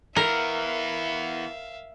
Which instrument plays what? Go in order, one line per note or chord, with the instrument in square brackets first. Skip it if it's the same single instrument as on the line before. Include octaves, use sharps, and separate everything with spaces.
[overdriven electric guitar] E3 B3 [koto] A#4 [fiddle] E5 F5